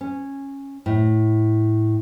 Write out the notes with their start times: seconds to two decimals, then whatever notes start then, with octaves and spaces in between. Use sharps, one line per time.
0.01 C#4
0.86 A2